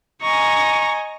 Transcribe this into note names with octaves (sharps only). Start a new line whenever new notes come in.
D#5 G#5 A#5 C#6